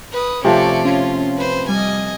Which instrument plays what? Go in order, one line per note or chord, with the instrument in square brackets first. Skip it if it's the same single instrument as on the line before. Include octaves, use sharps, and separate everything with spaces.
[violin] B4 D#6
[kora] C3 F3 A3 [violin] C#4 D5
[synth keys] C#4 C#5 [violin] F4
[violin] B4 C5
[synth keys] G3 [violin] D#5 G#5